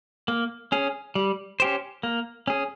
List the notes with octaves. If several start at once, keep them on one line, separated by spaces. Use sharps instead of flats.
A#3
C#4 G#4
G3
C#4 G4 C5
A#3
C#4 G#4